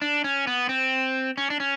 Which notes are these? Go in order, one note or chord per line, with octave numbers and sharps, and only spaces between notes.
D4
C#4
B3
C4
C#4
D4
C#4